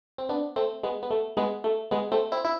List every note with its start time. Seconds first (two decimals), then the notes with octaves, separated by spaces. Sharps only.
0.18 C4
0.29 B3 D4
0.56 A3 C4
0.83 G#3 B3
1.03 B3
1.11 A3
1.37 G#3 B3
1.64 A3
1.91 G#3 B3
2.12 A3 C4
2.32 C4 E4
2.45 E4